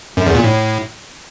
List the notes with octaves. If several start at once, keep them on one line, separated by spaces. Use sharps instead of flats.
F#2
E2
A#2
A2